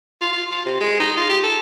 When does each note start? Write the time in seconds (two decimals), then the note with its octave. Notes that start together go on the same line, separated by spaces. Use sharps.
0.21 F4
0.33 F4
0.51 F4
0.65 C3
0.80 G#3
1.00 D#4
1.17 F4
1.29 G4
1.43 A4